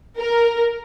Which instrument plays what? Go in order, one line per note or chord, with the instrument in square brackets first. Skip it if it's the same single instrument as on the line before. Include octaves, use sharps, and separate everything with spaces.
[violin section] A#4